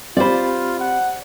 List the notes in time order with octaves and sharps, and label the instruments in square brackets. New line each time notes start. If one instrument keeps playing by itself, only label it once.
[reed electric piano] C4 G4 B5 [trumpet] F4 [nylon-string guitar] C5 D5
[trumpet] F#5